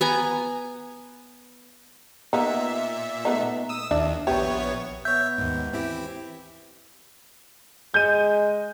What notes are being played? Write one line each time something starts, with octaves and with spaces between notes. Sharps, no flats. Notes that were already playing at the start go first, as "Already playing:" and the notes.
B3 G#5 A#5
A#2 A#3 B3 D#4 E5
A3 B3 D#4
D#6 E6
D#2 D4 E4 E5
A#1 B3 G4 C#5 E5
B3 C#5 E5 G6
D#2 G#2
E3 C4 E4 G4
G#3 G6 D#7